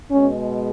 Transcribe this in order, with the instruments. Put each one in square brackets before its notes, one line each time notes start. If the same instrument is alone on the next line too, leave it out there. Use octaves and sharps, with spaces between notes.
[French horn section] B2 G#3 C#4